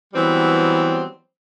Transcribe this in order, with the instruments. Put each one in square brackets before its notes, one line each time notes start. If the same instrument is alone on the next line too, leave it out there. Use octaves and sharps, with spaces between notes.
[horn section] E3 F#3 G3 B3 C4